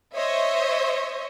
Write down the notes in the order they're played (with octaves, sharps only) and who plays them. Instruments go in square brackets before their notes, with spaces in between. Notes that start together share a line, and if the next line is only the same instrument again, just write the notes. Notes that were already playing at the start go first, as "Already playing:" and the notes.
[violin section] C5 C#5 D#5 E5